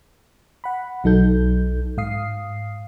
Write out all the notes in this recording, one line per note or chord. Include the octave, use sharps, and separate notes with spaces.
F#5 B5
B1 F#3 D#4 A4 G6
G#2 F5 D#6 C7